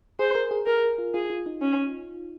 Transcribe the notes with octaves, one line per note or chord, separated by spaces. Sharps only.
G#4 C5
A#4
G#4
G#4 A#4
F4
F4 G#4
F4
D#4
C#4